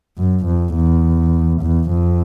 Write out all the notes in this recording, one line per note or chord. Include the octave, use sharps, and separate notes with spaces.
F#2
F2
E2
E2
F2